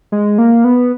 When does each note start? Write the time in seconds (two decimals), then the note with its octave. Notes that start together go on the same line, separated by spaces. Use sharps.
0.12 G#3
0.38 A#3
0.64 B3